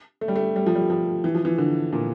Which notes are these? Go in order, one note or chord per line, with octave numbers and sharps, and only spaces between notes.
A3
G3
A3
G3
F3
G3
F3
E3
F3
E3
D3
A#2